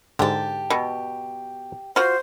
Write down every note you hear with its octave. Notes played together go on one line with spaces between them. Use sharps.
G#2 D3 G4 A5
B2
F4 F#4 C5